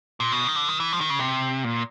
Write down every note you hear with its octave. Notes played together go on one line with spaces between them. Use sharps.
A#2
B2
D#3
D3
D#3
E3
F3
D#3
C#3
C3
A#2